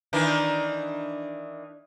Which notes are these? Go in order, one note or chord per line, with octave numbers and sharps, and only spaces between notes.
D#3 E3 D4